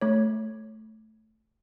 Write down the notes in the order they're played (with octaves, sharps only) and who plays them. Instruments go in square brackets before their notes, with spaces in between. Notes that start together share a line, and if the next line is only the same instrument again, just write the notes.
[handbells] A3 C#5